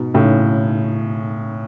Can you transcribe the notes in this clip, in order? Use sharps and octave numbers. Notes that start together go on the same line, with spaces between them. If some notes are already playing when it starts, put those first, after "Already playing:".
Already playing: G#2 B2
A2 C#3